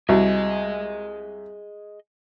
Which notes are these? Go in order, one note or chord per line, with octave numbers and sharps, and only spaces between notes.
C2 F#4 G#4 D#5